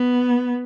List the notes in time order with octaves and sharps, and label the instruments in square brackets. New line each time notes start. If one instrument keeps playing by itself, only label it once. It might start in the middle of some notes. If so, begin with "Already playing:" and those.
Already playing: [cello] B3